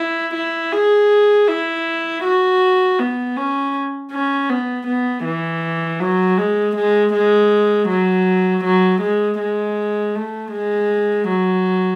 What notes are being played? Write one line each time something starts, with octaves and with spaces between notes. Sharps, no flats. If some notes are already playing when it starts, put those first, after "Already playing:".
Already playing: E4
E4
G#4
E4
F#4
B3
C#4
C#4
B3
B3
E3
F#3
G#3
G#3
G#3
F#3
F#3
G#3
G#3
A3
G#3
F#3